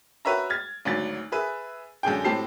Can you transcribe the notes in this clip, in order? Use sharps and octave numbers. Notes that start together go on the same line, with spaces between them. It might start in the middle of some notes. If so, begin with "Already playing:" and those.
F#4 B4 C#5 E5 A#5
F6 G#6 A6
G#1 D2 F#3 A6
G#4 B4 E5
F#2 D3 G#4 G5
A2 C4 G4 A5 C7